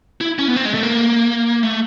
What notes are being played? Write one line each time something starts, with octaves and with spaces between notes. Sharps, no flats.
E4
C#4
B3
C4
G#3
A3
A#3
A3